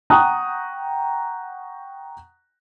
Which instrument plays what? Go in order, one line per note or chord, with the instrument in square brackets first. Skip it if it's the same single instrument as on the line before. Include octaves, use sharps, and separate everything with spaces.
[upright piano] F#5 G5 A#5 C#6 D#6 F#6